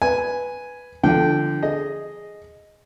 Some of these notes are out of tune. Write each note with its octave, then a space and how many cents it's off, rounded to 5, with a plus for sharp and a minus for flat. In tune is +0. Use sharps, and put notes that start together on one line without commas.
B4 +0 G#5 +0
D3 +0 F3 -30 G5 -15
G#4 +0 D#5 +0